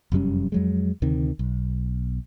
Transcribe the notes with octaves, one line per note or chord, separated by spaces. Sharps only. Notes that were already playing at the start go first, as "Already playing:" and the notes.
F1 F#2 G3 C#4
F2 F#3 G#3
D2 C3 D#3
B1